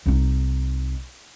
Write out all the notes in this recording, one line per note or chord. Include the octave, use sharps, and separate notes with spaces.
C2 D#4